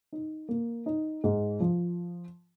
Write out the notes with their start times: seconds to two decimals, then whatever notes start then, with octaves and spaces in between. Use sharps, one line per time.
0.13 D#4
0.49 A#3
0.86 D#4
1.24 G#2
1.60 F3